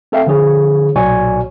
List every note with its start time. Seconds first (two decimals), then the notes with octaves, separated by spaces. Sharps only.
0.12 C4 A4 E5 F5 G5
0.27 D3 F3 D4 G#4 C#5
0.96 B1 A#2 F#4 C#5 D5 G#5